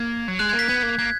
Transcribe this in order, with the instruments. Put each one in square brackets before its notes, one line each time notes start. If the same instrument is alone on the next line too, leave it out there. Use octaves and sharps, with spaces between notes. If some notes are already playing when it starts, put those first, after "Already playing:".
Already playing: [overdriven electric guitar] A#3 [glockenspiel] G#6
[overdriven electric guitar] F#3
[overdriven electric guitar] G#3 [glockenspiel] F#6
[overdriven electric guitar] A#3 [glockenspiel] G#6
[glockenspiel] B6
[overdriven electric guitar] B3 [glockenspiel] G#6
[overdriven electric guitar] A#3
[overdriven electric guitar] A#3 [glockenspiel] G#6